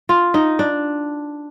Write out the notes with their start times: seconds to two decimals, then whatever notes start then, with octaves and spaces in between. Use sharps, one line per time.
0.09 F4
0.34 D#4
0.59 D4